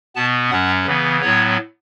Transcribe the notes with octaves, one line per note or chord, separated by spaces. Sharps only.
B2 B3 A5
F#2 F#3 C#4 F#5
C#3 E3 B3
A2 F#3 B3 C#5